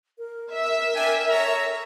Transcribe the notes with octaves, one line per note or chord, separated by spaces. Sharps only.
A#4
E5 E6
D4 G5 G#5
A4 C#5 A#5